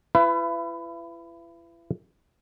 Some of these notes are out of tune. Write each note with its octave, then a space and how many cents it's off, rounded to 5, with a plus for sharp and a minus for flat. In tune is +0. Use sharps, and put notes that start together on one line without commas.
E4 +40 B4 +20 E5 +45